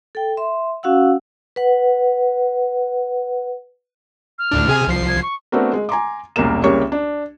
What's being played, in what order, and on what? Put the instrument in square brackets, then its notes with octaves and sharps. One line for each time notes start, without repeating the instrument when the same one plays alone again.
[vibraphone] A4 G5
E5 C6
C#4 F#4 F5 F#5 E6
B4 F#5
[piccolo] F6
[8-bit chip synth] D2 A2 D4
C3 G#4 G#5
C2 F3 C7
[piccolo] G#6
C#6
[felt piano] A3 B3 C4 D4 F#4 A#4
G#3
G#5 A#5 C6 D6
E1 C2 A#3 C#4 A#4 E7
C2 C#3 A#3 G4 C#5 C#6
D4